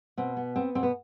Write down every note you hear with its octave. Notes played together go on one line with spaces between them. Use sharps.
B2 C4
B3
B3 C4
B2 C4
B3